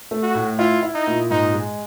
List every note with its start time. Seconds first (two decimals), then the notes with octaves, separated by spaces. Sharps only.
0.11 A3
0.23 F#4
0.35 A2
0.58 E4 F4
0.83 E4
0.94 D#4
1.07 A#2
1.30 G#2 D#4
1.54 G#3